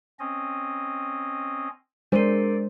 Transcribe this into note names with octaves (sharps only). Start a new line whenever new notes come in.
C4 C#4 D#5
G#3 D4 A#4 C5 D5